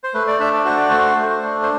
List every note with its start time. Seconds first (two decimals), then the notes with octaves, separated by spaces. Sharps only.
0.04 C5
0.14 A3 B4
0.27 D5
0.40 D4 E5
0.53 D5
0.65 F#4 C5
0.77 D5
0.89 A3 C5
1.17 A3
1.42 D4
1.63 C5